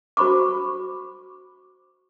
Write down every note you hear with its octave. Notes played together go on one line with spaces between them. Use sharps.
F#4 C5 B5 C#6 D6